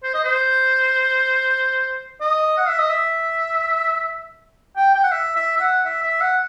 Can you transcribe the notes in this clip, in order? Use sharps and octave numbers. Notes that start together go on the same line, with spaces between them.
C5
D#5
C5
D#5
F#5
E5
D#5
E5
G5
G5
F#5
E5
E5
E5
F#5
E5
E5
F#5